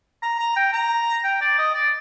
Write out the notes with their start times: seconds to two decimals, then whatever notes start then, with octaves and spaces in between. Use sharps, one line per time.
0.23 A#5
0.39 A#5
0.56 G5
0.73 A#5
1.24 G5
1.41 D5
1.58 D#5
1.75 D5